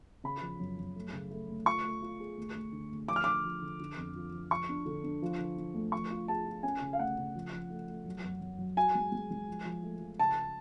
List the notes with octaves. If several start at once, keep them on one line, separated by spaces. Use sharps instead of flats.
C#3 B5
F3
F#2
F#2
A3
C#3
A3
D2
F4 C#6
A3
F4
G#4
D2
D2
D3
D2
F3 D6
F6
D3 D6
F3
D3
D3
F2
F3
F3
F3 C#6
D4
D3
D4
F3
D3
D3
D2
F3 C#6
F4
G#4 A5
F4
C#4 G#5
C#3
F5
D2 F#5
C#3
F3
F3
A3
A3
F#3
F#2
F#2
F#3
F#4 G#5
G#3
G#3
G#3
F3
F3
A3
F3
C#3 A5